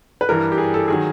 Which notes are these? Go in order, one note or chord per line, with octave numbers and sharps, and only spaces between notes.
B4
G2 E3 G3 A#4
G4
G#4
A4
D#3 F#3 G#4